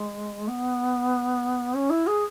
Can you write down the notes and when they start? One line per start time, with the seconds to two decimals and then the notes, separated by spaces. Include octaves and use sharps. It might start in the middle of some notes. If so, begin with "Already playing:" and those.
Already playing: G#3
0.48 B3
1.75 C#4
1.90 E4
2.07 G#4